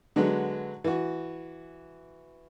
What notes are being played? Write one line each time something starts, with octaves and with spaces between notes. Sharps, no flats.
D3 F#3 G#3 B3
E3 F#4